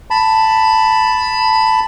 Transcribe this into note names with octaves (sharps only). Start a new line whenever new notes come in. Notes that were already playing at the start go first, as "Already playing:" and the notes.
A5 B5